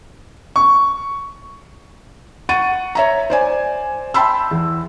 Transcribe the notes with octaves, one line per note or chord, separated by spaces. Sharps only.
C#6
F#5 C#6 A6 D#7
C#5 E5 A#5
C5 D5 G#5
G5 A5 B5 C6 E6
E2